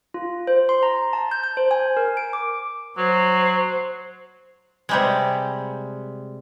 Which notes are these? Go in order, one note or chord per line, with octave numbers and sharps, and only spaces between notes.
F4
C5
C6
A#5
A5
G6
G6
C5
G#5
A#4
D7
D6
F#3 C5
C3 G3 G#3